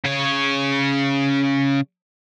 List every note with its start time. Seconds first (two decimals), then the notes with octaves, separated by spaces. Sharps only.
0.05 C#3 C#5